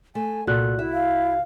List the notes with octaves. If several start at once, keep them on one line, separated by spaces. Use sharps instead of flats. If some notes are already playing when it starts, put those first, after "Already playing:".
A3 G#5
C2 A#2 F#4 A4 F#6
E4 E5
F5